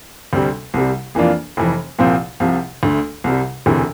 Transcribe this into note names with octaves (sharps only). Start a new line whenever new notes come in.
D2 C3 G3 C4
C2 C3 G3
F2 E3 A#3 D4 F4
F1 F2 E3
C2 A#2 F3 C4
C2 C3 F3
D2 D3 A3
C2 C3 G3
E1 D2 C3 E3